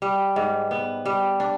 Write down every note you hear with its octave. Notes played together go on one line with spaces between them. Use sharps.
G3
G#2
B3
G3
D4